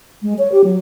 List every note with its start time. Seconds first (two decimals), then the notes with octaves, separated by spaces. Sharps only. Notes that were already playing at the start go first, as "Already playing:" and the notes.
0.22 G#3
0.38 C#5
0.52 G4
0.64 F#3